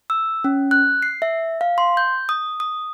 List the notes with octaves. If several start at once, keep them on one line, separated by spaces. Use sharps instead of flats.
E6
C#4
F#6
C7
E5
F5
C6
G6
D#6
D#6